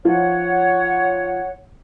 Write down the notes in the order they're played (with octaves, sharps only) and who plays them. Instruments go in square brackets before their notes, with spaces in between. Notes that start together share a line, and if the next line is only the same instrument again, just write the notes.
[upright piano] F3 D#4 F4 [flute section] C#5 F#5